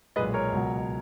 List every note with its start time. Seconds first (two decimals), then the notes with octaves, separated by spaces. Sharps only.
0.16 B1 A#2 G#3 B4 D#5
0.34 A#4 C#5
0.52 C#2 B2 F#3